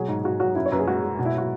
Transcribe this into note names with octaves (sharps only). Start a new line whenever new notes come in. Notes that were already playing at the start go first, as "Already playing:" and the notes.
Already playing: B2 F#3 G#4
G#2
G#2 F#4
F#3 F#4
F#2 E4
C#5
F#2 B4
G#4
G#3 F#4
G#3
B2
E4
F#3 F#4